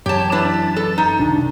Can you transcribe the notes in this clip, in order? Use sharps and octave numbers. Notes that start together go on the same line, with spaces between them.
F#2 E3 G4 C#5 A5
D4 E4 B4 A6
A4
D#4
C2 D#3 D4